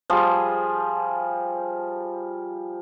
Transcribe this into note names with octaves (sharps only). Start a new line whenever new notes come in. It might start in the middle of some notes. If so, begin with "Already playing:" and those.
F3 G3 G#4